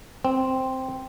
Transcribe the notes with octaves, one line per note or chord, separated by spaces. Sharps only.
C4